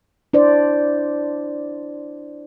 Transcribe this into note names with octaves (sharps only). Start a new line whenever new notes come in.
D4 E4 C5 D5